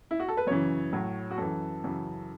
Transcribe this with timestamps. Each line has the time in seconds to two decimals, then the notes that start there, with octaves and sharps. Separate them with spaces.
0.11 E4
0.20 F#4
0.29 A4
0.37 B4
0.47 F#2 C#3 E3 C#5
0.93 A2 F#3
1.31 F#4
1.38 F#2 E3 A4
1.84 F#2 C#3 E3